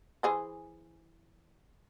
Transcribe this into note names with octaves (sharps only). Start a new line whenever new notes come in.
E3 G#4 C5